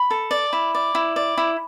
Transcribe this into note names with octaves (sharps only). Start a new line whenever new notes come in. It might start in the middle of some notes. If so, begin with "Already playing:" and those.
Already playing: B5
A4
D5
E4
D5
E4
D5
E4